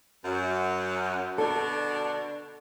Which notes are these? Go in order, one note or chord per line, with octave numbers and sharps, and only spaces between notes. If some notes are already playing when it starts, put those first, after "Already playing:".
F#2
B2 D3 D4 A4